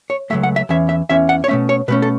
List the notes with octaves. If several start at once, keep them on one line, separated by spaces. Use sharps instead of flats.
C#5
C#2 C#3 F#3 A3 E5
F#5
E5
E2 E3 C#4 E5
E5
E2 E3 C#4 E5
F#5
C#5
B2 A3 C#4 E5
C#5
B2 A3 C#4 B4
A4